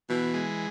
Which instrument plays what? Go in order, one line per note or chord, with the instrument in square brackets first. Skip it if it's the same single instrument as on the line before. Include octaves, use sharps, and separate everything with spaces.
[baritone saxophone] B2 [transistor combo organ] E3
[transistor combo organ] G#3